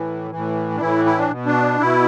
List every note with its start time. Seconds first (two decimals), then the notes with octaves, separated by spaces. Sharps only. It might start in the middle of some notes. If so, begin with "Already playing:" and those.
Already playing: A2 E3
0.31 A2 E3
0.76 D4
0.80 A2 E3 E4
1.06 E4
1.18 D4
1.30 B2
1.46 D4
1.80 B2 E4